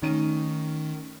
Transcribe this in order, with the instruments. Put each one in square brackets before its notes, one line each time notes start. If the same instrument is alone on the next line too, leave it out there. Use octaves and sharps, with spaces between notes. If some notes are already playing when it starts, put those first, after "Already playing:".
[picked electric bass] D#3 [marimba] A3 D#4 [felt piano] C#4 D#7